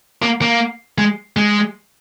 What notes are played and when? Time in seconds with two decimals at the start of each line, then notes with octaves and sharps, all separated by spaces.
0.22 A#3
0.42 A#3
0.98 G#3
1.37 G#3